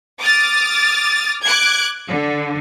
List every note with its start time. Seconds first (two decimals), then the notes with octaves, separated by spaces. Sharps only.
0.20 D6 D#6 F6 A6
1.44 D6 F#6 G#6
2.07 D3